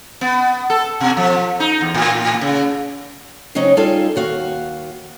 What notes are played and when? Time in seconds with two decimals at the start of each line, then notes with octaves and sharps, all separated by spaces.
0.21 B3
0.70 A4
1.00 B2
1.17 F3
1.60 D#4
1.81 E2
1.94 A2
2.41 C#3
3.55 C#3 F#3 C4 C#4 D#4
3.77 G3 D#4 F4 G#4 A4 F5
4.16 D#2 F#4 F5